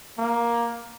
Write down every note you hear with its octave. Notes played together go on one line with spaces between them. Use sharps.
A#3